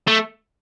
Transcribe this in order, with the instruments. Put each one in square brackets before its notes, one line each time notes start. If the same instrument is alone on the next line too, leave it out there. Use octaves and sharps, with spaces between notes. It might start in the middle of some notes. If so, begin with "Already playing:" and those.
[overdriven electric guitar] A3